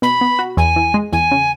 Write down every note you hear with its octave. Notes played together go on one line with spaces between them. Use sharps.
B2 B5
B3
F#4
E2 G#5
E3
G#3
E2 G#5
C#3